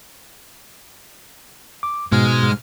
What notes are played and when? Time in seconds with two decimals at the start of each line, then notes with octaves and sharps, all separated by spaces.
1.83 D6
2.12 G#2 B2 G#3 F6